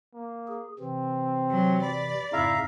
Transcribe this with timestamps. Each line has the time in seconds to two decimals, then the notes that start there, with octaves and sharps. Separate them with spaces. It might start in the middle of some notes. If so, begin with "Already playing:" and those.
0.14 A#3
0.47 G#4
0.80 C3 E3 C4
1.51 F#3
1.82 D5 B5
2.33 F2 G#2 C#3 E4 E5 F5 A#5